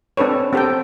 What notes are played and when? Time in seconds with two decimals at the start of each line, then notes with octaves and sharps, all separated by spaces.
0.17 C4 D4 A4 B4 C#5
0.53 C4 G4 A4 C5 G5